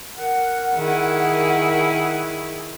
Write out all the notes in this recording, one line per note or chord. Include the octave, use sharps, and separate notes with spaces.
A#4 F#5
D#3 E4 G#4